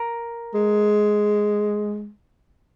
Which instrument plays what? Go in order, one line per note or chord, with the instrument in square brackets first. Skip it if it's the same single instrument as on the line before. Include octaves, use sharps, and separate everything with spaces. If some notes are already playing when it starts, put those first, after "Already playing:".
Already playing: [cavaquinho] A#4
[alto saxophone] G#3